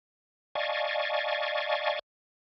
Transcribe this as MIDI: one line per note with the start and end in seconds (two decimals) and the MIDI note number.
0.55 1.99 74
0.55 1.99 75
0.55 1.99 77
0.55 1.99 80
0.55 1.99 81
0.55 1.99 85